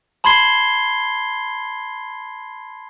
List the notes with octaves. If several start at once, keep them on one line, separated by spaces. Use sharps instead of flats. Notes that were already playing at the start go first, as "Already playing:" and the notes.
A5 B5 C6 G#6 C7 G7